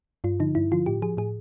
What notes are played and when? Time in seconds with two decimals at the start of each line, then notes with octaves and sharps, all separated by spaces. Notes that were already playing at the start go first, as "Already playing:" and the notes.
0.24 G2 F4
0.40 D3 F3 D#4
0.55 G2 E4
0.72 D3 F3 F4
0.86 A2 G4
1.02 F3 G#4
1.17 A2 G#4